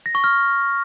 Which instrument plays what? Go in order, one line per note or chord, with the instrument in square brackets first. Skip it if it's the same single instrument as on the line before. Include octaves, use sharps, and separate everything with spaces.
[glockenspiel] A#6
C#6
F6